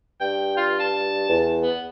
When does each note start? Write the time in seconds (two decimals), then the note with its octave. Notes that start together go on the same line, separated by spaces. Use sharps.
0.21 G2 G5
0.57 F4
0.80 A5
1.29 E2
1.63 B3